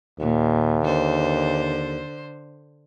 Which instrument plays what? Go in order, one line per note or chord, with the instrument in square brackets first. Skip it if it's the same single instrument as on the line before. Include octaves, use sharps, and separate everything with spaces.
[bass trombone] D#2 [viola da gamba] A#2
[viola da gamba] D3 C5